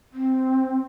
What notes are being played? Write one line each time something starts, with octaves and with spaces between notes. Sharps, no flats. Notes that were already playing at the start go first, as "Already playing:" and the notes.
C4